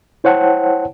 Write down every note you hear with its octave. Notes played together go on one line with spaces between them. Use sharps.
E4 C5 C#5 F#5 G5 A5